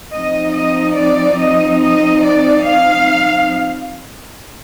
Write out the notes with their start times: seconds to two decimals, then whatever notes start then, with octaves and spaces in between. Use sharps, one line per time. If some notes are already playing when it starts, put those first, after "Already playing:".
0.11 F3 C4 D#4 D#5
0.53 D#5
0.96 D5
1.38 D#5
1.81 D#5
2.23 D5
2.64 F5